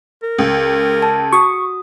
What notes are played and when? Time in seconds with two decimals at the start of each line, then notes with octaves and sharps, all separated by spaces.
0.23 A#4
0.39 C#2
1.02 A5
1.32 F#4 C#6 D#6